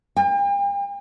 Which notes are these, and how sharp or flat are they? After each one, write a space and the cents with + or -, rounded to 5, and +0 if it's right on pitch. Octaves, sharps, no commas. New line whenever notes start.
G5 +40